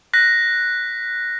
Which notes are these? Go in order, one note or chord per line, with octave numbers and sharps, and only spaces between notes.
F#6 A#6 B6